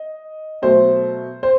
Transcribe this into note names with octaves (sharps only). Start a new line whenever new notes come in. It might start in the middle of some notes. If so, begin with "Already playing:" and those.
Already playing: D#5
B2 F#3 A3 C5
C5